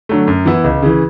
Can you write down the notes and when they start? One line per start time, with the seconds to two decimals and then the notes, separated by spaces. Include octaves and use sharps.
0.09 D3 F#3 A3
0.28 F#2
0.46 E3 B3 E4
0.64 C#2
0.83 C#3 E3